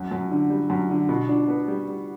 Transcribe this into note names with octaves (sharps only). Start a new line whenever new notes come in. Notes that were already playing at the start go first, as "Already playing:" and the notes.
Already playing: F#2
F#2
D3
G3
F#2
D3
B2
D4
B3
G3
G3